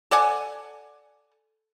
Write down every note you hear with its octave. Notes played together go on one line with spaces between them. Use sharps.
A4 D5 F#5 G#5